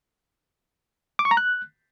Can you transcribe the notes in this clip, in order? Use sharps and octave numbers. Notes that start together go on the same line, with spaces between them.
D6
C#6
A#5
F#6